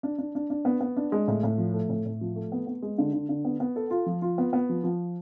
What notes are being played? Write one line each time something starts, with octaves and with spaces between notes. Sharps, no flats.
D4
D4
D4
D4
B3
B3
D4
G#3
A2
A2
F3
A3
A2
A2
F3
A3
B3
B3
G#3
D3
D3
D3
B3
B3
A4
F4
F3
F4
B3
B3
F3
F3